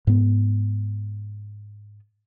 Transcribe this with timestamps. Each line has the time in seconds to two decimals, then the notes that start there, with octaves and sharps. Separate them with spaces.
0.07 G#2 B3